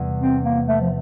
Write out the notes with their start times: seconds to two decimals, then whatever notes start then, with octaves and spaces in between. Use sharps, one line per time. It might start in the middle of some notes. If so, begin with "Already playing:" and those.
Already playing: E2 C3 G3
0.21 C4
0.44 A#3
0.67 A3
0.81 F3